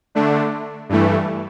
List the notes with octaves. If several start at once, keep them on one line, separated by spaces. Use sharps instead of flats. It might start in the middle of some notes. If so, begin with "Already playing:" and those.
D3 A3 D4
G2 E3 A3